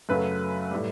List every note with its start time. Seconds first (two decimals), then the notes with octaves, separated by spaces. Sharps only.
0.09 F#2 C#3 F#3 A3 B4
0.71 A2 G3